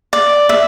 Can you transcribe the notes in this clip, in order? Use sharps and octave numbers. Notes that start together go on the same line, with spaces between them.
D5
E5